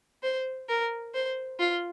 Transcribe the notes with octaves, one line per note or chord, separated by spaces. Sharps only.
C5
A#4
C5
F4